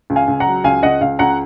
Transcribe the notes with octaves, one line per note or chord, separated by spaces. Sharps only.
C#2
F5 G#5
C#2
F#5 A#5
F#3
C#2 F5 G#5
C#2 D#5 F#5
C#2 F5
C#2 F#5 A#5